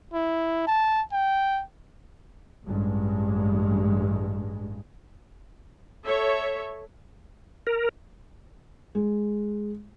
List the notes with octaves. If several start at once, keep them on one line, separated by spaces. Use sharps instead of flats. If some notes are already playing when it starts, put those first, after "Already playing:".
E4
A5
G5
A1 G2 G#3
A4 C#5 E5
A#4
G#3